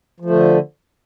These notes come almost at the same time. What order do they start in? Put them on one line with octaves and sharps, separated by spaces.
F3 A3 D3